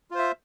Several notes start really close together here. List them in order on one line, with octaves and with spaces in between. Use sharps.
F4 C5 E5